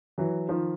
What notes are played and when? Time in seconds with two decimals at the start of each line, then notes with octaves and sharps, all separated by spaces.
0.18 E3 F#3
0.49 D#3 F3